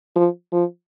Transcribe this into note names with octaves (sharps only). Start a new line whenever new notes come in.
F3
F3